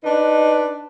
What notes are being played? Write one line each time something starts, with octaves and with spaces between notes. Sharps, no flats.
D4 D#4 B4